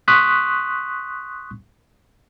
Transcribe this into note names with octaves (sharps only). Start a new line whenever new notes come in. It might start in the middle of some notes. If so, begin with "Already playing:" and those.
C6 C#6 D#6 F#6 B6